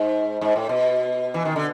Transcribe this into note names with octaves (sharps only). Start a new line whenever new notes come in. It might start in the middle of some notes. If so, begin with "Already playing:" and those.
Already playing: G#2
G#2
A2
B2
E3
D#3
D3